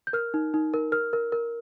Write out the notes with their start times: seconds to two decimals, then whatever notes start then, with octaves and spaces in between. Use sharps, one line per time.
0.07 G6
0.13 A#4 F6
0.34 D#4
0.54 D#4
0.74 A#4
0.92 A#4 F6
1.13 A#4
1.32 A#4